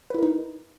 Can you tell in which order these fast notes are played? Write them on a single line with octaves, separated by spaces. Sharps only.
B4 E4 A#4 D#4